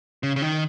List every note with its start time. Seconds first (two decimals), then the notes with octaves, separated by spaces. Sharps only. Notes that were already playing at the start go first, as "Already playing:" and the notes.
0.23 C#3
0.36 C#3
0.42 D#3